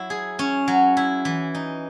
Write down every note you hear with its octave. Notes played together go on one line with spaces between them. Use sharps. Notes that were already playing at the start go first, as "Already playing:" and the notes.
Already playing: F#3 E4
G#4
C#4
F#3
E4
E3
D#4